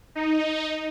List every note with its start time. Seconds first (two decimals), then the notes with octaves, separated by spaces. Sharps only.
0.15 D#4